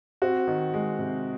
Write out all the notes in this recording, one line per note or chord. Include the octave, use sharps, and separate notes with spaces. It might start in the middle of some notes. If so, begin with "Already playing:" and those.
C4 F#4
D#3
G#3
C3